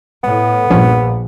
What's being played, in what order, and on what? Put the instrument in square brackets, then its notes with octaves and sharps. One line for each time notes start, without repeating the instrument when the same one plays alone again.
[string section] A2 [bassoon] B3
[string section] A#1 [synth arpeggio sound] G2 F3 C#4